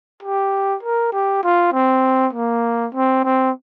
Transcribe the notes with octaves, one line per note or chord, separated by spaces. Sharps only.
G4
A#4
G4
F4
C4
A#3
C4
C4